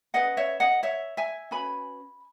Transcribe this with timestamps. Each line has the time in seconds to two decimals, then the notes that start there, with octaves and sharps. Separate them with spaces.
0.14 C#4 G#4 B4 D#5 F#5
0.37 C#5 E5
0.60 D#5 F#5
0.83 C#5 E5
1.17 E5 G#5
1.51 C#4 F#4 B4 G#5 B5